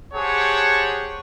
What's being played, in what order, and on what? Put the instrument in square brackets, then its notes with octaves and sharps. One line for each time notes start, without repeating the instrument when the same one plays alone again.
[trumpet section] G4 G#4 C5 C#5 F#5 A5